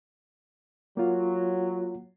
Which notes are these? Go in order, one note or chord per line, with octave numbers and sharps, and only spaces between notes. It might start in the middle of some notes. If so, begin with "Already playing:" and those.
F#3 A#3 F4